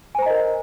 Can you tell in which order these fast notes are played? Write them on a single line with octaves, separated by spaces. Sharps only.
G#5 C5 A#5 D#5 A#4